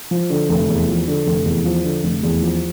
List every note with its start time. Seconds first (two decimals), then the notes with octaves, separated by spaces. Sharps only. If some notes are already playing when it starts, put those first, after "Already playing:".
0.11 F3
0.30 D3
0.49 F1
0.69 E2
0.88 F3
1.07 D3
1.27 F1
1.45 E2
1.65 F3
1.84 D3
2.03 F1
2.23 E2
2.42 F3